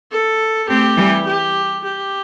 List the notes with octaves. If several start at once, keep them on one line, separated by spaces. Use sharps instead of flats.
A4
A3 C4 G4
E3 G3
G4
G4